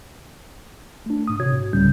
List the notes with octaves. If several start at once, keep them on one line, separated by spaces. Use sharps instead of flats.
A3 D4
G#2 D#6
G#1 C3 F#4 C#5 G#6
G#2
C2 G#2 C#3 G3 C#4 G6